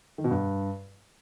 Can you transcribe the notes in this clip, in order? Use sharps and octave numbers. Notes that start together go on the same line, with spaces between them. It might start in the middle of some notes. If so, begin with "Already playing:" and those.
D#3
B2
G2